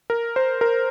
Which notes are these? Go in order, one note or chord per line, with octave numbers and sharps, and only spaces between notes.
A#4
C5
A#4